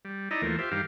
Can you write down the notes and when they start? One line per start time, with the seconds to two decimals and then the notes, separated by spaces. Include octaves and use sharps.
0.05 G3
0.31 D#4 E4 D5 D#5 A#5
0.42 D#2 E3 F3 A3 A#4
0.59 F4 G4 C5 E5
0.71 G2 D#3 G4 F5